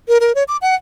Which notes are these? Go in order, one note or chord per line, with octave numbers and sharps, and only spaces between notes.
A#4
A#4
C#5
D6
F#5